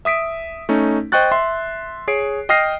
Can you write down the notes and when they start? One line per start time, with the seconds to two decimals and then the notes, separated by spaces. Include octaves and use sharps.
0.05 E5 D#6 B6 D7
0.69 A3 C#4 D#4
1.12 C5 D#5 G5 C#6 F#6 A6
1.31 E5 C6
2.08 G#4 C#5 C7 D7
2.49 D#5 G5 D#6 F6 A#6 C7